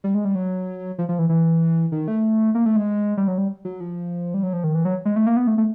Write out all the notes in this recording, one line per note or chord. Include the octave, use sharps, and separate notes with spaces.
G3
G#3
G3
F#3
F3
F3
E3
E3
D#3
A3
A#3
A3
G#3
G3
F#3
G3
F#3
F3
G3
F#3
F3
D#3
E3
F#3
G#3
A3
A#3
B3
A3
A3